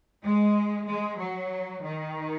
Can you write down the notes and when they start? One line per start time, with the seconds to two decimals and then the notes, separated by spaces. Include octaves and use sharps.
0.23 G#3
0.87 G#3
1.19 F#3
1.83 D#3